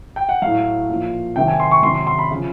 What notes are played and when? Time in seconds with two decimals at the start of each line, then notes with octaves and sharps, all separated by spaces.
0.16 G5
0.29 F#5
0.42 A2 F#3 F5
0.90 A#2 F3
1.36 C3 D#3 F#3 G5
1.48 G#5
1.60 C6
1.71 C#6
1.83 C3 D#3 F#3 C6
1.95 C6
2.07 C6
2.19 B5
2.31 C#3 F3